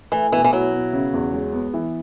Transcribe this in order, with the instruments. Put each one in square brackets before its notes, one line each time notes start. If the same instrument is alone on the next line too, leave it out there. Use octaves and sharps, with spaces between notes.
[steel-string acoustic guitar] E3 [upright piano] A3
[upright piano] B2 [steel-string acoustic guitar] E3
[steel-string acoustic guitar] E3
[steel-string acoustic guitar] F#3 [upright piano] E4
[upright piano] B2
C#3
E2
G#3
B3
E3